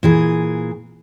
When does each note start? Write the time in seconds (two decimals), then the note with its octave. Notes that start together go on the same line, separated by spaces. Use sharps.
0.03 A#2 E3 G#4